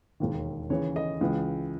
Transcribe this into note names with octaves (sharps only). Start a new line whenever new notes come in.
E1 D#2 D#3
D#2 C#3 E3 C#5
D#5
C#2 C#3 E3